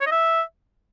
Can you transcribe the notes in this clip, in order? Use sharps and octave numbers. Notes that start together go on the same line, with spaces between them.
C#5
D#5
E5